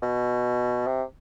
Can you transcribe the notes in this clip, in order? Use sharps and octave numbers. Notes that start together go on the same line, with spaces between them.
B2
C3